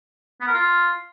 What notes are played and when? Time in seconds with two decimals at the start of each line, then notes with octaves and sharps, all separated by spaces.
0.41 B3
0.48 A#4
0.54 F4